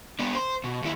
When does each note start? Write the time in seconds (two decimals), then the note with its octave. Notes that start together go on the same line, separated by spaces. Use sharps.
0.19 B3 D4
0.35 C5
0.64 B2
0.82 D#2 E4